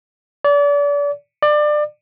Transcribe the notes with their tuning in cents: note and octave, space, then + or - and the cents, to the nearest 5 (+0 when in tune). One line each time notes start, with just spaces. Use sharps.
D5 -35
D5 +25